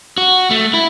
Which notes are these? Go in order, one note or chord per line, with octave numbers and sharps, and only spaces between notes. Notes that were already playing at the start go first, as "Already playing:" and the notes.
F#4
A3
E4